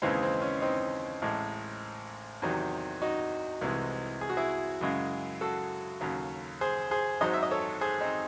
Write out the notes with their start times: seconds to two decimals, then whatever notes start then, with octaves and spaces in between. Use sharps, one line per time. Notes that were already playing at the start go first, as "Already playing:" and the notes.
0.02 D#2 C#3 E3 G#3 C4 D#4
0.23 C4
0.42 C#4
0.61 C4 D#4
1.22 A1 A2 G#3
2.42 E2 C3 D#3 F#3
3.02 D#4 F#4
3.61 C2 C3 E3 G#3
4.21 G#4
4.29 F#4
4.37 E4 G#4
4.81 F#2 C#3 G#3
5.41 F#4 A4
6.01 D#2 C#3 F#3
6.61 G#4 C5
6.91 G#4 C5
7.21 G#1 G#2 F#3 C5 D#5
7.33 E5
7.43 D#5
7.51 A4 C#5
7.81 G#4 C5
8.01 C4 D#4